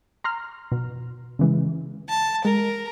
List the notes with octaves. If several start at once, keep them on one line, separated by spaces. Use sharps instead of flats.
A#5 C6 F6
B2
C#3 E3 G#3
A5
G#3 A#4